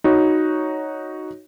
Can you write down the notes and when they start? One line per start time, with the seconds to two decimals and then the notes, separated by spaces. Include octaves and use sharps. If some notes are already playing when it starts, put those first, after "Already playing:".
0.04 D#4 F#4 C#5